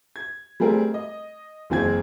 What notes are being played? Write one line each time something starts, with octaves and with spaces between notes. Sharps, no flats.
G#6
G3 A3 C4 G#4 A#4
D#5
F#1 E3 C4 G#4 G#6